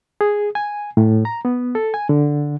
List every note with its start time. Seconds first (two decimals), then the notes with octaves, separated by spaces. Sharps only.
0.21 G#4
0.55 G#5
0.97 A2
1.25 A#5
1.45 B3
1.75 A4
1.94 G#5
2.09 D3